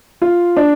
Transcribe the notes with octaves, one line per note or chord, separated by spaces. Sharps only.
F4
D4